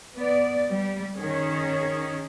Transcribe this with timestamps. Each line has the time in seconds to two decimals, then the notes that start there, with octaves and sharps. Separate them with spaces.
0.17 B3 D5
0.69 G3
1.15 D#3 C#4 G#4